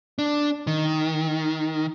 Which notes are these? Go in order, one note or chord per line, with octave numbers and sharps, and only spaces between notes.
D4
D#3